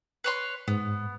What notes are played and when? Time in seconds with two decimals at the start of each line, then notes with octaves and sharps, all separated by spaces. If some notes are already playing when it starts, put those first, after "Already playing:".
0.24 B4 C#5 C6
0.68 G#2 B3